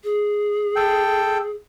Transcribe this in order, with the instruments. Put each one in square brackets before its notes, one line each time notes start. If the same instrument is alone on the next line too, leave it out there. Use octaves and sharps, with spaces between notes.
[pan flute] G#4
[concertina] A4 G5